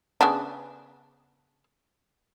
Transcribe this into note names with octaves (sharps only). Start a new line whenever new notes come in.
C#3 B3 D4